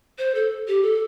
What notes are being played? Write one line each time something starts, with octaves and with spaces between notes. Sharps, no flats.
C5
A4
G4
A4